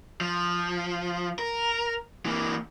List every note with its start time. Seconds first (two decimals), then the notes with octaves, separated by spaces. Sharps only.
0.21 F3
1.39 A#4
2.25 E3 A#3